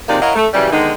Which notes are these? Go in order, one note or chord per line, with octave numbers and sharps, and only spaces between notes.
F2 C3 G#3 A#3 D#4 D5
E4 A#4 C#5 D#5 F5 F#5
A3
F#2 C#3 E3 G3
D3 D#3 G#3 B3 D#4